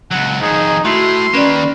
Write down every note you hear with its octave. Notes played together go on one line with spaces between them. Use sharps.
C#2 F#3 F#5
F2 D#3 D#4 G#4
A2 E4 F#4 C6
D#3 A#3 C#4 B4 D5